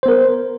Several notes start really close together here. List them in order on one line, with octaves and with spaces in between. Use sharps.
C5 B3 A#4